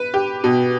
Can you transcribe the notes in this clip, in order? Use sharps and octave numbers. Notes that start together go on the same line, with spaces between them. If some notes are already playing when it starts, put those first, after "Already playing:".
Already playing: B4
G4
B2